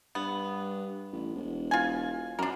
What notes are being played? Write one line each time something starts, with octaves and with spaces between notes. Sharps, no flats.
G2 B3
A1
E1
F4 G#5
F#2 D4 A#4